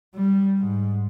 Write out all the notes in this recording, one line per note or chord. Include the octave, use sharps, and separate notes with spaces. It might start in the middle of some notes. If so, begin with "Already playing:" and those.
G3
G#2